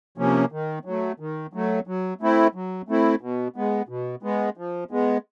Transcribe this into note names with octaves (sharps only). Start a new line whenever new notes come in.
C3 F3 A#3 C#4
D#3
F#3 A3
D#3
F#3 A3
F#3
A3 C4 E4
F#3
A3 C4 E4
B2
G#3 B3
B2
G#3 B3
F3
G#3 B3